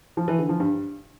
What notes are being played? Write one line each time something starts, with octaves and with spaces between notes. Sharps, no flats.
F3
E3
D3
F3
G2